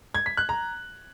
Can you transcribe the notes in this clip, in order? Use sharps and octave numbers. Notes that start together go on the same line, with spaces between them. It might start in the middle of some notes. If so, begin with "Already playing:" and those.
G#6
B6
F#6
A#5